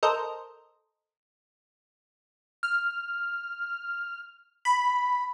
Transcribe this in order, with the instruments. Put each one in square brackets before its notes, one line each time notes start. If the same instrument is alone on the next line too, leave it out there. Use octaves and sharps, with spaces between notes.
[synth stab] A4 A#4 C5 D#5
[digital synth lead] F6
B5